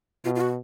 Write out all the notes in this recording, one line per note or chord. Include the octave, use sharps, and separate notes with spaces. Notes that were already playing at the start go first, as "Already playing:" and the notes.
B2 F4
F4
F#4